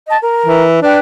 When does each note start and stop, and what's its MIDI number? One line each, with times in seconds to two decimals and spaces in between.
0.07 0.16 75
0.07 0.16 81
0.21 0.63 70
0.46 0.79 52
0.82 0.99 62
0.82 0.99 71
0.82 0.99 79